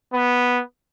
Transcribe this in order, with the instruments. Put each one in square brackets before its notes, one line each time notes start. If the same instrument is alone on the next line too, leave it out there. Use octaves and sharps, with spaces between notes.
[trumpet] B3